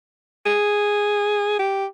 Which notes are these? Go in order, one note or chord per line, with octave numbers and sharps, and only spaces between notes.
G#4
G4